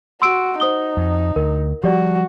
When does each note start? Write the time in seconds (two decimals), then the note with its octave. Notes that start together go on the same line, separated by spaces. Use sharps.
0.22 F#4 C6 E6 D7
0.60 D#4 C5 D#6 G7
0.97 F2
1.36 D2 A#4
1.84 F3 G3 F#4 G4 D5